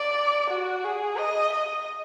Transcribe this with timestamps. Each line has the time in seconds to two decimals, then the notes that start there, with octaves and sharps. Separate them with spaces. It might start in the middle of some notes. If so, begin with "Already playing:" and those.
Already playing: D5
0.50 F#4
0.84 G#4
1.18 D#5
1.53 D#5